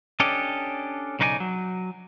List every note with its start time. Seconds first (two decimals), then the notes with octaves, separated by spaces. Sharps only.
0.20 C#4 D4 G4 A4 D#5
1.19 B1 C#3 D#4 B4 D5 G#5
1.40 F#3